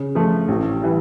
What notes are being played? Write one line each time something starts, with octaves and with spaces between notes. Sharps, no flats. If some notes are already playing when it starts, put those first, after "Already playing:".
Already playing: C#3
F3 A3
A1
E3 G3